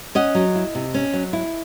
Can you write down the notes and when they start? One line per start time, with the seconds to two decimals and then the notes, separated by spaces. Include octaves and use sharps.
0.15 C#4 D#5 F#5
0.35 F#3
0.56 E4
0.75 C3
0.94 C#4
1.13 F#3
1.33 E4